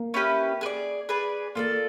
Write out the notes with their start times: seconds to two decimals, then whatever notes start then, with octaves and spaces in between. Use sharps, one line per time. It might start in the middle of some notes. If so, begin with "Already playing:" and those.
Already playing: A#3
0.14 C#4 E4 G4 B4
0.61 G#4 B4
0.66 D5
1.09 G#4 B4 D5
1.55 A#3 F4 A4 D5